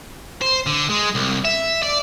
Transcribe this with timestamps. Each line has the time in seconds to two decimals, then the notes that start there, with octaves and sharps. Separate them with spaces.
0.42 C5
0.66 D3
0.90 G#3
1.15 C2
1.45 E5
1.83 D5